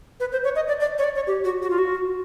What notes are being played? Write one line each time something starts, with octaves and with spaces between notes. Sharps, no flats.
B4
C5
C#5
D#5
D5
D5
C#5
D5
C#5
G4
F#4
F#4
F4
F#4